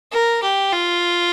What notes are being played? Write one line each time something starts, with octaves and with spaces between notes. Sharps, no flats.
A#4
G4
F4